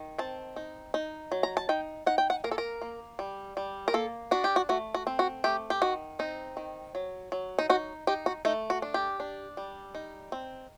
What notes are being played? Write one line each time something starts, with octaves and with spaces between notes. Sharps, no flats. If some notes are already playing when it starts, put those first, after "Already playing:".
Already playing: D#3
C4 A5
D#4
D#4
F#3
A#5
A5
D#4 G5
D#4 F#5
G5
F#5
A#3 A#4
A4
A#4
A#3
G3
G3
A#4
A#3 A4
D4 F#4
G4
F#4
A3 F#4
F#4
C4
F#4
A3 G4
G4
D#3 F#4
C4 D#4
D#3
F#3
F#3
D#4
D#4 F#4
D#4 G4
F#4
A3 D#4
F#4
D4
G4
D4
G3
D#4
C4